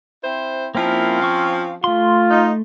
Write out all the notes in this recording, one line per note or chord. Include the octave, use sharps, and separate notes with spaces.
C4 E4 C5
F3 A#3 C4 C#4 E4 A#4
F5 C#6 E6
A3 F4 C6
D#4